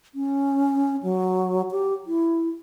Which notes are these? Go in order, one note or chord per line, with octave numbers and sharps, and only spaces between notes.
C#4
F#3
G4
E4